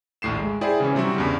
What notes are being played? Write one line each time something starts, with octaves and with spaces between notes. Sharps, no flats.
A#1 D#2 A2 C7 E7
G#3
E4 G#4 C5 D5 G5
C#3 E3 C#4
C3 F#3 G3 C4 E4 F#4
E2 G2 C#3